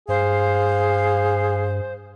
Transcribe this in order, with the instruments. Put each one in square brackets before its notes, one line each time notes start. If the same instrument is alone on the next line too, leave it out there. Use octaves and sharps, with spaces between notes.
[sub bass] G2 [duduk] G#4 [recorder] C5 [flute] F5